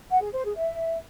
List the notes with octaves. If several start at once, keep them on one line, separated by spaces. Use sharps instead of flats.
F#5
G#4
C5
G#4
E5